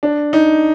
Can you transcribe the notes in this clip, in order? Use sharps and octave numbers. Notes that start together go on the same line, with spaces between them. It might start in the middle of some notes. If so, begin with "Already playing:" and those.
D4
D#4